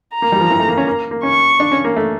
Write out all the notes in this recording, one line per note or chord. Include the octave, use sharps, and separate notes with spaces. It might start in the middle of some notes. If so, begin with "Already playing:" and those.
A#5
A#3
G3
F3
E3
A3
A#3
C#4
A#3
A#3
C#4 C#6
D4
C#4
A#3
A3